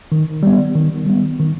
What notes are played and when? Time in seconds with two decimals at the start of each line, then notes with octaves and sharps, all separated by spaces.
0.12 D#3
0.43 G3 B3
0.75 D#3
1.07 G3 B3
1.39 D#3